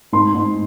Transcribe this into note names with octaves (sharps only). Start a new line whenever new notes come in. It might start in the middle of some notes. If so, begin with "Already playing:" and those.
G#2 C6
G#2